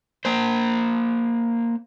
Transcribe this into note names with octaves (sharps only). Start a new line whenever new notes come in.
A#3 C5